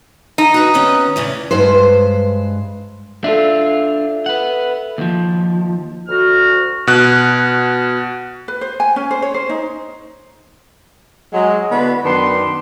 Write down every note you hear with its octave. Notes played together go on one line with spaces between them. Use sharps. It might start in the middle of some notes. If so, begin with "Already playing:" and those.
D#4
F#4 B4
D#3 B3 C#4
E2 A2 C#3
G2 G#3 B4 C5
D4 F4 A4 E5
B4 F#5
D#2 F3
D2 F#4 F6
B2 F#6
B4
C5
G#5
C#4
C5
C#5
C5
D#4
F#3 G#3
D3 B3 D4 E4 F#4
F#2 D#3 B3 D4 B4 C6